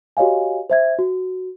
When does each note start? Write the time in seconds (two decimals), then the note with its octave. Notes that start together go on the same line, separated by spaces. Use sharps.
0.17 F#4 G4 C#5 D#5 F5 G#5
0.70 C5 E5 G#6
0.99 F#4